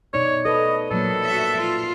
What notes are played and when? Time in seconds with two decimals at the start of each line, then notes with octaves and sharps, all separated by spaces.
0.14 B2 D#4 C#5 D5
0.45 A4 B4 D#5
0.91 A#2 F#3 A#3 A4
1.25 F#4 E5
1.56 F4